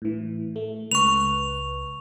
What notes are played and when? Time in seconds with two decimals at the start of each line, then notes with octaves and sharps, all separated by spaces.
0.02 A2 E3
0.56 A3
0.91 C#2 B4 C#6 F7